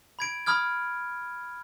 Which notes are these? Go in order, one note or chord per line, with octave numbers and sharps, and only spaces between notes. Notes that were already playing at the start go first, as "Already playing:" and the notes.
B5 G#6 D7
B5 D#6 F6 G#6